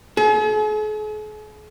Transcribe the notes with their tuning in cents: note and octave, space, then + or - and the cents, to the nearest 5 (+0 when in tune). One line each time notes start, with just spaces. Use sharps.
G#4 +45